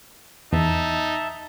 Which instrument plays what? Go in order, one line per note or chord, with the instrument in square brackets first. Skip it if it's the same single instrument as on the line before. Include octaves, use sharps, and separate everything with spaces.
[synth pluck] E2 [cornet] D#4 [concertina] E5 A5